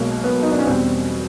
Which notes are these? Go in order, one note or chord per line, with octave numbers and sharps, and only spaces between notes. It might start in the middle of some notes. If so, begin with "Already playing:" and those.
Already playing: B1 B2 G#3 A#3
B3
D#4
D4
C#4
E2 B2 G3 C4